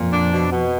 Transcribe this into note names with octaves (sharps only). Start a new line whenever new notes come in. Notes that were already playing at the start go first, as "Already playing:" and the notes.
Already playing: F2 A#2
D4
B2
B2